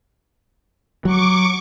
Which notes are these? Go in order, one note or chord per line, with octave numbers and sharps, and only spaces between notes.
F#3 C#6 D6